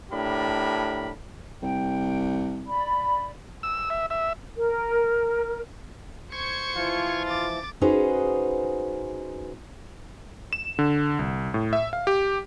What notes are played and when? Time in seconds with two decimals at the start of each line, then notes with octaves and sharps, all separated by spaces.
0.12 A2 D4 G4 A#4 B5
1.62 C2 G5
2.67 D5 B5
3.63 E6
3.90 E5
4.10 E5
4.56 A#4
6.32 C5 C#6 G#6 C#7
6.76 E3 F3 E4 F4
7.27 D6 A6
7.81 C#4 D#4 F#4 G#4 B4 C5
10.53 E7
10.79 D3
11.19 C2
11.54 A2
11.73 E5
11.93 F5
12.07 G4